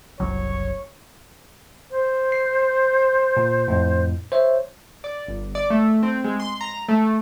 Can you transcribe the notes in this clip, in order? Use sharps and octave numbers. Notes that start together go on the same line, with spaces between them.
F#1 C2 F#3 C#5
C5
C7
A#2
F2 A2
C5 C#5 E5
D5
G1
D5
A3
C4
G#3
C6
A#5
A3